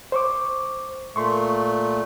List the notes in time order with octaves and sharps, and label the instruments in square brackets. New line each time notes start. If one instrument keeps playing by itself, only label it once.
[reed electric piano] C5 C#6 D6
[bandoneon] A#2 A3 [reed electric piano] C6 C#6